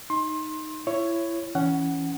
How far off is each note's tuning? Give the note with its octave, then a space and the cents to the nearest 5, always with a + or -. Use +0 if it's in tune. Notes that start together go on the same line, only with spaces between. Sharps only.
D#4 +0 C6 +25
E4 +25 C#5 +0
E3 +0 C#4 +5 F#5 +10